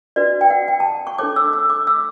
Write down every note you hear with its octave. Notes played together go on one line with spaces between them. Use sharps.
D4 F#4 B4 D5
G5
F#5
G5
A5
C#6
D4 A4 C#5 D6
E6
E6
D6
E6